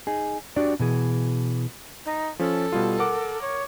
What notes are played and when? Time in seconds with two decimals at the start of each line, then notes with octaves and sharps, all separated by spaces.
0.07 D#4 G#4
0.56 D4 F#4 G4 D5
0.80 B2 E3 G#4
2.06 D#4
2.39 F3 C#4 A4
2.72 B2 G3 F4
2.99 A#4 F#5 D6
3.42 C#5